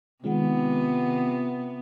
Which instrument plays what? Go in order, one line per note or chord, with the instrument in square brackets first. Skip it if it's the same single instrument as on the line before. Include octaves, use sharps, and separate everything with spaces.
[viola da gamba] C3 B3 [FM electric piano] D#3 G#3 C4 [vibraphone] F4 F#5